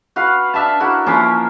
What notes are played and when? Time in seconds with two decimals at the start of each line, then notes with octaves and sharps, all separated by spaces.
0.16 F#4 B4 F5
0.54 D4 E5 F5 A5
0.80 E4 F#4 A#4
1.06 F3 A#3 C#4 E4